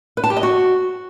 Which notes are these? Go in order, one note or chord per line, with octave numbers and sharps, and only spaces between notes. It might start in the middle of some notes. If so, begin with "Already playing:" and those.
B4
A5
G4
D#5
F#4